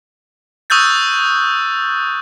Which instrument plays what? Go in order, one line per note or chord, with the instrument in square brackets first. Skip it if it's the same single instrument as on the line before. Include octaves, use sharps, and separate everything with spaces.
[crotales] C#6 D#6 E6 F#6 G6 A6